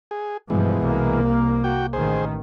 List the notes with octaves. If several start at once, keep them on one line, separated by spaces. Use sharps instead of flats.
G#4
G2 B2 E3 F3 G#3
C2 A#3
F#4 G5
A1 D#3 G#4 C5